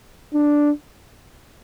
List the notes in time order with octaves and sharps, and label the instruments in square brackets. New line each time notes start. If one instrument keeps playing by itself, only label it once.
[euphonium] D4